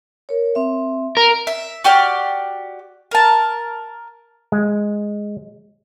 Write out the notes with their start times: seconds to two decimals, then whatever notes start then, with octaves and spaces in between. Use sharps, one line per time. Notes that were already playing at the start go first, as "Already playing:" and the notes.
0.29 A#4 C#5
0.55 C4 E5
1.17 A#4
1.47 E5
1.84 F#4 G4 D5 F6
3.11 A#4 A5
4.52 G#3